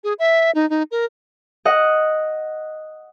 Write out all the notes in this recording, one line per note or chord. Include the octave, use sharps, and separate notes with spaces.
G#4
E5
D#4
D#4
A#4
D#5 F#5